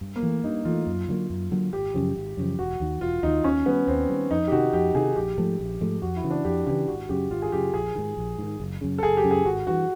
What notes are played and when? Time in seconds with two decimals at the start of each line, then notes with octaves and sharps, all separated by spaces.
0.01 G2
0.16 A#3
0.23 E3 A3
0.44 G2 D#4
0.65 E3 A3 F4
0.87 F#2
1.08 D3 F#3 A#3
1.30 F#2
1.51 D3 F#3 A#3
1.73 G#1 G4
1.94 F#2 C#3 F3
2.16 G#1
2.37 F#2 C#3 F3
2.59 E1 F#4
2.80 D#2 D#3
3.01 E1 F4
3.23 D#2 D#3 D#4
3.44 D#2 C#4
3.66 D#3 G3 B3
3.87 D#2 C4
4.09 D#3 G3
4.31 F2 D#4
4.48 G4
4.52 C3 D#3 F#4
4.73 F2 G4
4.95 C3 D#3 G#4
5.16 A#1 G4
5.38 G#2 F3 A3
5.59 A#1
5.81 G#2 F3 A3
6.02 F2 F#4
6.16 E4
6.24 C#3 E3
6.31 D4
6.44 F2 G4
6.67 C#3 E3 G4
6.88 G#1 F#4
7.09 F#2 C#3 G4
7.31 G#1 F4
7.42 G#4
7.52 F#2 C#3 G4
7.74 A#1 G#4
7.95 G#2 D#3
8.17 A#1
8.38 G#2 D#3
8.60 F#1
8.81 F#2 C#3
8.98 A4
9.03 F#1 G#4
9.17 G4
9.24 F#2 C#3
9.31 G#4
9.46 G#1 F#4
9.67 G2 E3 F#4